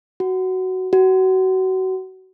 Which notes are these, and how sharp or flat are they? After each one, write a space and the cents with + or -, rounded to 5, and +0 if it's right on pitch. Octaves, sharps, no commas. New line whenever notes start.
F#4 +10
F#4 +25